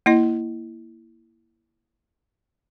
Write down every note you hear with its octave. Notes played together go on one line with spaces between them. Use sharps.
A#3 E4 D#5